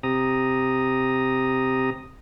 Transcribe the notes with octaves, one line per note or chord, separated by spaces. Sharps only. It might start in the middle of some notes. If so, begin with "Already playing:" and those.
C3 A#5 D#6